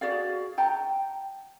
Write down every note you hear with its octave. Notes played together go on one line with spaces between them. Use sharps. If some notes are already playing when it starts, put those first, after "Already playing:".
F#4 G#4 D5 F5
F#5 G5 A5 A#5